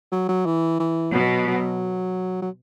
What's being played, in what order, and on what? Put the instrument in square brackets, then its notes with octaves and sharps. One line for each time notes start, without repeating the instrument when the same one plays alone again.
[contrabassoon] F#3
F#3
E3
E3
[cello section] B2 [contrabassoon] F#3
[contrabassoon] F#3
F#3